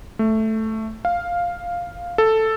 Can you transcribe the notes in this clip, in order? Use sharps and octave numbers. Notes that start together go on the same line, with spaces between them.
A3
F5
A4